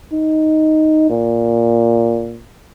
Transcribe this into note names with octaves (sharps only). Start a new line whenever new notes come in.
D#4
A#2